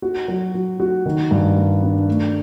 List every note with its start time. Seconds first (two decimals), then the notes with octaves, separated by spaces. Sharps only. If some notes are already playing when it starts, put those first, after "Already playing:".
0.02 F#4
0.28 F#3
0.54 F#3
0.80 F#4
1.06 D#3
1.31 G2
1.57 G3
1.83 D4
2.07 A3